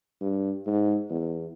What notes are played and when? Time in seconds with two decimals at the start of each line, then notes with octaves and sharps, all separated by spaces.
0.21 G2
0.66 G#2
1.10 E2